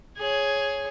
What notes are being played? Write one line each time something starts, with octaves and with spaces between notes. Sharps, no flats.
G#4 C#5